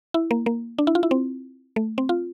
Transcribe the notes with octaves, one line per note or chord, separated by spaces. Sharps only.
E4
A#3
A#3
D4
E4
F4
E4
C4
A3
C4
F4